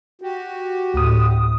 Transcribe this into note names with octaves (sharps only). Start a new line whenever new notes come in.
F#4 G4
D2 A2 D#6